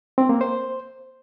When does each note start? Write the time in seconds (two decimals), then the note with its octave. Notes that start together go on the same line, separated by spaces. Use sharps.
0.18 C4
0.29 A#3
0.41 C5